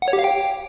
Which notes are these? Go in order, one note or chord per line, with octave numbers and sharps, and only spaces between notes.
F#5
C#5
G4
F5
G5